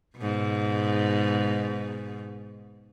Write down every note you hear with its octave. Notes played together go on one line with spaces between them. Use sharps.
G#2 B2